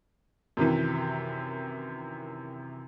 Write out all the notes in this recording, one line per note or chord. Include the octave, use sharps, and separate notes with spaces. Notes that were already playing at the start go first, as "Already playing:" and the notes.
F#2 C3 D#3 E3